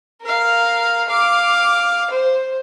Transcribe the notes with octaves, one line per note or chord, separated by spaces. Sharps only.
A#4 F5
F5 D6
C5